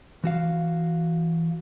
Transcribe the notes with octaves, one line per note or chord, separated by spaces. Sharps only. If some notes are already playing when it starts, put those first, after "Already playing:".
E3 F#4 F5